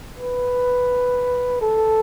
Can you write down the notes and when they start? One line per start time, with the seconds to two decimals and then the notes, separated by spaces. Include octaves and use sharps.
0.17 B4
1.61 A4